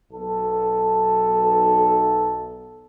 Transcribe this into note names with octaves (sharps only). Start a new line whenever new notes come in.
B1 A4